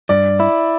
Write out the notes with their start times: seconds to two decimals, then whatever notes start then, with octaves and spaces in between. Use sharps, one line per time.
0.09 G2 D5
0.40 E4